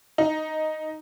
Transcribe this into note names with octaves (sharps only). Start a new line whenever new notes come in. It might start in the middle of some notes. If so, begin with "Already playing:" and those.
D#4